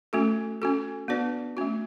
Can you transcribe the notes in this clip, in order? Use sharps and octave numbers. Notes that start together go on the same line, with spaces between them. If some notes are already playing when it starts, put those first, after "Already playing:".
A3 C#4 F#4 A4
C#4 F#4 A4
B3 D4 F#4 B4 D5
A3 C#4 F#4